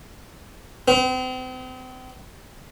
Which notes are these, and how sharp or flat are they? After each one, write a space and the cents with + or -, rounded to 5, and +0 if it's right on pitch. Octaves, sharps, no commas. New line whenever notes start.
C4 -40